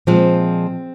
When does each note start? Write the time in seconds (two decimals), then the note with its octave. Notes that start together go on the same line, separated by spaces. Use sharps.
0.07 A#2 F3 G#3 C4